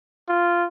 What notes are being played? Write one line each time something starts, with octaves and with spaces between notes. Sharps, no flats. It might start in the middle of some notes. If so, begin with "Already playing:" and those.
F4